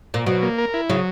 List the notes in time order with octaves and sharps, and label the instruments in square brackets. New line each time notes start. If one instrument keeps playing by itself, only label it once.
[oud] A#2
[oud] B2 [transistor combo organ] F#3
[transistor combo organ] A#3
A#4
E4
[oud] C#3 [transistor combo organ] F#3